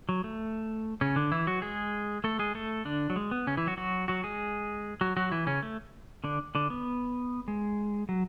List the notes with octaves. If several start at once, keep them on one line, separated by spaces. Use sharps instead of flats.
F#3
A3
C#3 C#4
D3 D4
E3 E4
F#3 F#4
G#3 G#4
A3 A4
G#3 G#4
A3 A4
D3 D4
F#3
G#3
B3
C#3 C#4
E3 E4
F#3 F#4
F#3 F#4
F#3 F#4
G#3 G#4
F#3 F#4
F#3 F#4
E3 E4
C#3 C#4
A3
D3 D4
D3 D4
B3
G#3
F#3